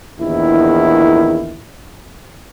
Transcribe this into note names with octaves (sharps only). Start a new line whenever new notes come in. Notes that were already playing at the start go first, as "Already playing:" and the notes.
A#1 E2 D#3 E4